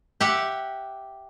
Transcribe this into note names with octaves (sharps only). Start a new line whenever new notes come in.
G4 E5 F#5